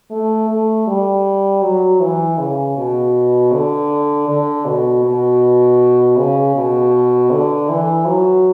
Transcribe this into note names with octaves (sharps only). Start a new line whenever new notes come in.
A3
A3
G3
F#3
E3
C#3
B2
D3
D3
B2
B2
C#3
B2
D3
E3
F#3